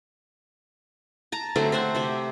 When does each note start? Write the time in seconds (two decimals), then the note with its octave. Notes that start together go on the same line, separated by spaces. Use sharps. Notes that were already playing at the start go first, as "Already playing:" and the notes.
1.32 A5 A#5
1.56 D3 F#3 A3 C4
1.72 C4 C5 E5 F#5
1.95 C3 G4 E5